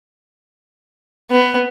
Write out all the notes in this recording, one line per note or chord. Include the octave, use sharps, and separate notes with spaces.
B3